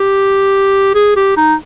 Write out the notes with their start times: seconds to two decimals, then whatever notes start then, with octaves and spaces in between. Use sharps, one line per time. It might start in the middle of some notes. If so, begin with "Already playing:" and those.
Already playing: G4
0.95 G#4
1.16 G4
1.37 D#4